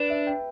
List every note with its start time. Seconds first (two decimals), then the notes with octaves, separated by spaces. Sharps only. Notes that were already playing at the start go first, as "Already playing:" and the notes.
Already playing: D4 B4
0.10 E5
0.27 G5